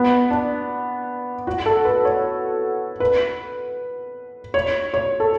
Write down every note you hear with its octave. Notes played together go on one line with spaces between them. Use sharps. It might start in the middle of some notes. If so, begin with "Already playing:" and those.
Already playing: B3
D4
F#4
A4
B4
C#5
B4
C#5
C#5
A4